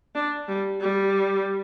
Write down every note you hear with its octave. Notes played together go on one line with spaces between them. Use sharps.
D4
G3
G3